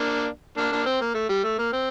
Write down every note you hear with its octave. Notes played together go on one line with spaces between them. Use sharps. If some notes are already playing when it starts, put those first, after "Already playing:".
Already playing: A#3 D4
A#3 D4
A#3 D4
C4
A#3
A3
G3
A3
A#3
C4